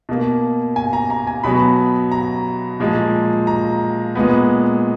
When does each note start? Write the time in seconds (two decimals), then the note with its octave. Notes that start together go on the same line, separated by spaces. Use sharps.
0.09 B2 A#3
0.76 G#5
0.93 A#5
1.10 A#5
1.27 G#5
1.43 B2 F#3 B3 B5
2.12 A#5
2.80 A#2 F3 G#3
3.47 A#5
4.15 A#2 G#3 B3